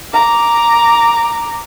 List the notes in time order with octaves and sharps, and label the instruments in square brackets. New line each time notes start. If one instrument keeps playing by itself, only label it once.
[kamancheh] A#5 D6